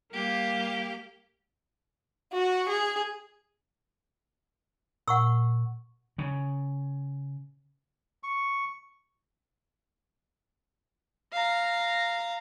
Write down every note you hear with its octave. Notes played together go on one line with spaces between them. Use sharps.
G3 A#3 G4 F5
F#4
G#4
A#2 F#5 C#6 E6
C#3
C#6
F5 A#5